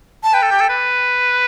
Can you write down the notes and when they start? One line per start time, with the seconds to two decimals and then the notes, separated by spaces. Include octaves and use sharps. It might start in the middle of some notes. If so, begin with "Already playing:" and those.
0.23 A5
0.33 B4 G5
0.42 A4
0.51 G4
0.60 A4
0.69 B4